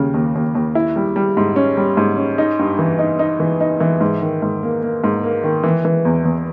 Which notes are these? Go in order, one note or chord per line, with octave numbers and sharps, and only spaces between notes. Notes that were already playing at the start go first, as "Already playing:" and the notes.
Already playing: D#2 C#3 G3
D#2
D#2
D#2
E4
G3
G3
G#2
C#4
G3
G#2
C#4
D#4
G2
E3
D#4
D#4
E3
D#4
E3
G#2
D#3
G#2
A#3
A#3
G#2
A#3
D#3
E3
E3
E2
E2